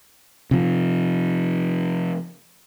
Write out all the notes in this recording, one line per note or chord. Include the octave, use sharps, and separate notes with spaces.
C3 F3